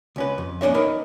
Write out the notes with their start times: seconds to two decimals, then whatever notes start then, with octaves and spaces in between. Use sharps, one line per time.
0.16 C#2 C#4 B4
0.38 F2
0.61 A#3 C#4 D4 C#5 E5
0.74 D#4 A#4 B4 C#5